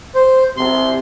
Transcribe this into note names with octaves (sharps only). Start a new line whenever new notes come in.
C5
C3 C6